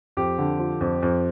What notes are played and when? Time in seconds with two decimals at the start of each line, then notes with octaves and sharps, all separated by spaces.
0.17 F2 G4
0.38 D3
0.59 F3
0.81 F2
1.03 F2